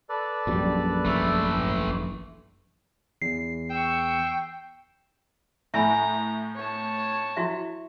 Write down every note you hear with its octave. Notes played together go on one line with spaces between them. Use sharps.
A4 B4 D5
A#1 F#2 G3
G1 E3 A3
E2 C7
G5 C#6 E6
A2 E5 G#5 A#5 B5
C#5 A5
E4 F#4 E5